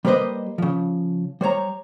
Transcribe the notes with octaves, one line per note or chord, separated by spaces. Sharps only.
G3 A#3 G4 B4 C5 D#5
C#3 F3
G3 C5 C#5 A#5